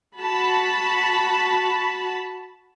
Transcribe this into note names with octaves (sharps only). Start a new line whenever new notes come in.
F#4 A5 B5